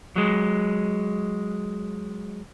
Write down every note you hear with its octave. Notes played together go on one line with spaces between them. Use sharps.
F#3 G#3